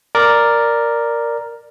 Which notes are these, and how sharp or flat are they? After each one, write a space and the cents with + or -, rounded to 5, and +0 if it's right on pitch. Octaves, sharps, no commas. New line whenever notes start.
A#4 +0 D5 +0